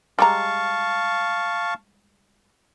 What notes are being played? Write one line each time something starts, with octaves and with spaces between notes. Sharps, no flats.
G3 G#3 F5 A5 A#5 C#6